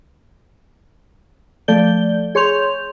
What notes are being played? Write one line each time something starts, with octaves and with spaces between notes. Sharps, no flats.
F3 A3 A4 D5 G6 G7
G#4 C#5 C6 C#6 G6 F7